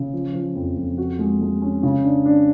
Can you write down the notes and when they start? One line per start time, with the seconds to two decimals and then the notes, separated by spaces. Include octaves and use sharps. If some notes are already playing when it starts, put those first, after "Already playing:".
Already playing: C#3
0.13 F3
0.34 F3
0.55 F2
0.77 F2
0.98 F#4
1.19 G#3
1.41 G#3
1.62 C#4
1.83 C#3
2.04 D4
2.25 D4